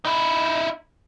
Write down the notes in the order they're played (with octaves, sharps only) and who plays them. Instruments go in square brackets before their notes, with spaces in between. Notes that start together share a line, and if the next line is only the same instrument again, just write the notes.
[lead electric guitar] D#4 E4